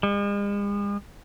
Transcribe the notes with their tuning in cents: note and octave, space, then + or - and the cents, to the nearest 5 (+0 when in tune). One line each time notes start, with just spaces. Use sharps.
G#3 -45